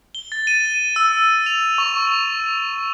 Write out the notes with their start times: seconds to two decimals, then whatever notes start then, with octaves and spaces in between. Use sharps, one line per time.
0.15 G7
0.32 A6
0.47 D#7
0.96 E6
1.46 F7
1.78 C#6